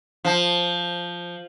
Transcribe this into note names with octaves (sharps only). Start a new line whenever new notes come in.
F3